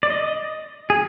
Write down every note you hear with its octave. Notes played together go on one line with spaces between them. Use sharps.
D5
D#5
G#4